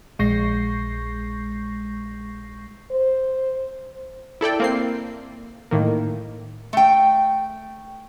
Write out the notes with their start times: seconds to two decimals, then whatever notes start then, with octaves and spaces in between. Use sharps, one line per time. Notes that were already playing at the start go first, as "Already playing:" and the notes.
0.19 A#1 G#3 C#6 G6 A#6 C7
2.91 C5
4.41 E4 A4 D5 G5
4.60 A#3 C4 C7
5.71 A2 D#3 A#3
6.73 A3 G5